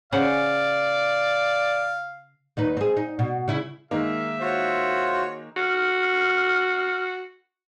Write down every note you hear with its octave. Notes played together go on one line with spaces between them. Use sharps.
C#3 C5 D5 F5 F#5
D#2 D#4 B4
C4 G#4
D#4
B2
C#3 E4
D#3 G#3 A#3 A#4 E5
F4 F#4 C5 C#5
F#4 F6